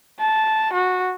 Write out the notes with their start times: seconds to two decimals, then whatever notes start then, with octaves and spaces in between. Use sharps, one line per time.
0.20 A5
0.73 F#4